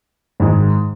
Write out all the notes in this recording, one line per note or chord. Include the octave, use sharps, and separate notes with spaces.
G#2 D#3 G#3